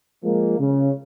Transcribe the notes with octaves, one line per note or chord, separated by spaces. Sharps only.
F3 G#3 A#3
C#3